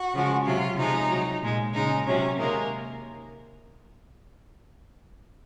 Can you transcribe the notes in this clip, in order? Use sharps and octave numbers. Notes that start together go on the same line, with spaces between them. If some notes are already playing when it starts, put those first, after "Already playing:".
Already playing: F#4
C#3 F3 G#3
C3 F#3 F4
C3 F3 G#3 D#4
C3 F#3
A#2 G#3
C#3 G#3 D#4
C3 F#3 C#4
C3 D#3 G#3 A#3